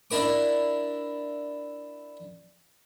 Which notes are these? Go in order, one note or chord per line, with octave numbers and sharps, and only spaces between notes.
D4 E4 A#4 D6